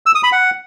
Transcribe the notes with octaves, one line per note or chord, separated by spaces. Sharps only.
E6
D#6
B5
F#5